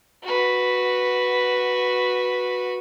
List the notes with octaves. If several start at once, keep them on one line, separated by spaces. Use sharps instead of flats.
F#4 B4